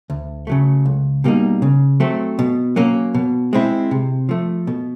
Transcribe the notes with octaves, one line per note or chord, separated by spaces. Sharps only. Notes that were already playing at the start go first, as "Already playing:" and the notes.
D2
C#3 F#3 A3
C#2
B2 G3 A#3 D#4
C#3
F#3 A3 C4
B2
F#3 A#3 C#4
B2
G#3 C4 E4
C3
F3 A3
B2